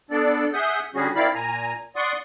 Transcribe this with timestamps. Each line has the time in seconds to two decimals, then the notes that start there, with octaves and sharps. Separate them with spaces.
0.11 B3 D4 A4 D5
0.53 G#4 E5 F#5 D#6 G6
0.95 D3 G3 C#4 F#4 G#4
1.15 D#3 C4 E4 D5 F5 B5
1.35 A#2 G#5 A#5
1.96 D5 F#5 C6 C#6 D#6